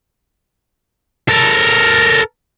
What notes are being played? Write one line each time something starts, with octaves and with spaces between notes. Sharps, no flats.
A4 A#4